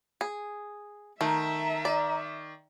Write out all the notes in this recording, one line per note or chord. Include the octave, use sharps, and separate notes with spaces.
G#4
D#3 A3 E5 A#5
D5